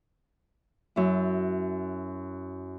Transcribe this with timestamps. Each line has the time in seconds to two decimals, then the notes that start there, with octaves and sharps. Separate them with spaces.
0.96 F#2 E4